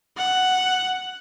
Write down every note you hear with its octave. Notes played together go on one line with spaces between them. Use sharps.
F#5